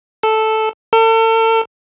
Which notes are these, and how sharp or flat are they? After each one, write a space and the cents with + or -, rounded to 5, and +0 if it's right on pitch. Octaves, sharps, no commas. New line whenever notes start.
A4 -5
A4 +40